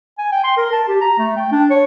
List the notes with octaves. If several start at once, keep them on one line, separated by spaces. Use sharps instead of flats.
G#5
G5
C6
A#4
A5
G4
A#5
A3
G5
D4
C#5